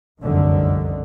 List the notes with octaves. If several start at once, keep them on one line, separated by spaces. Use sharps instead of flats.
F1 C2 F#2 D3 D#3